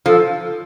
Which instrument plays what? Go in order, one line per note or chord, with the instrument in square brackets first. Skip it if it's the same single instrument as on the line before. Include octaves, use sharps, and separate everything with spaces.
[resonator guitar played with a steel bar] F3 [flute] A4